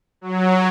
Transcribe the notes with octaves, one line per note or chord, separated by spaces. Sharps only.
F#3